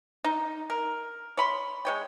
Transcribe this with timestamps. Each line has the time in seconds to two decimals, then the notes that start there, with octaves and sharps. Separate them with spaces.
0.24 D#4
0.70 A#4
1.37 C#5 B5 C6
1.85 G#3 C#5 G5